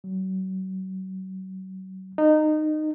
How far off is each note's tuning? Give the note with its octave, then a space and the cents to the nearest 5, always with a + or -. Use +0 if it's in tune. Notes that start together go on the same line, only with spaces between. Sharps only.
F#3 +35
D#4 -20